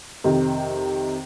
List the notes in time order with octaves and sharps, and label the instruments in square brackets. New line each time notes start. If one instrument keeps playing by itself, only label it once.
[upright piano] F2 C3 D#3